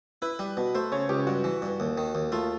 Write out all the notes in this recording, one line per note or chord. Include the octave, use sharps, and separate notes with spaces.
E4 B4
G3
B2
A3 C5
C#3 C#5
C#2 G4
G2 F#4
E3
G2
D#2
D#3
D#2
A3 F4